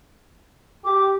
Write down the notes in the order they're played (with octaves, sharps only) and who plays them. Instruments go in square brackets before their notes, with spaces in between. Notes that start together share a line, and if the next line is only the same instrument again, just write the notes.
[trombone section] G4 [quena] D6